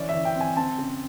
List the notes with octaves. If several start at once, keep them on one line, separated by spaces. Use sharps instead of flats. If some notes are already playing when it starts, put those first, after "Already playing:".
Already playing: E3 C#4 D5
E5
E3
G5
C4
G#5
C4 A5
C#3